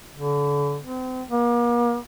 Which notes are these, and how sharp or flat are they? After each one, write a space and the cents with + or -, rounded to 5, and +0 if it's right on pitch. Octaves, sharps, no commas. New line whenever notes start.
D3 -35
C4 -35
A#3 +40